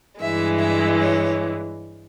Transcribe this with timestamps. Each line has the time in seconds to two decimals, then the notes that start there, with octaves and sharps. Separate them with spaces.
0.21 G2 E3 G#3 E5
0.60 E5
1.00 C#5